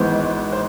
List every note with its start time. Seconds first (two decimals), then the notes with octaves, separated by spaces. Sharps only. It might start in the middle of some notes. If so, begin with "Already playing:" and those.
Already playing: G#1 G#2 E3 B3 C5
0.53 C5